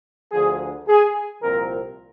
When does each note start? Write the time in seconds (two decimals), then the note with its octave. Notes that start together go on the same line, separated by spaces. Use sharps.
0.32 D2 D3 F3 G#4
0.88 G#4
1.41 C2 A#2 F3 C4 A#4